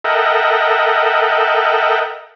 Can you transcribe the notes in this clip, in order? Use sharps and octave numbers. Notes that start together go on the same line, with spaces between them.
A4 A#4 D#5 E5 F#5 G5